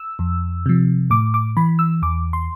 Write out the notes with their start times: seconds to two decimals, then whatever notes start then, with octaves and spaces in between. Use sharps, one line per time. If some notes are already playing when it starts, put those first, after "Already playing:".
Already playing: E6
0.19 F2
0.66 C3 F3
1.10 A2 D6
1.34 D6
1.57 E3 B5
1.79 E6
2.02 E2 D6
2.33 C6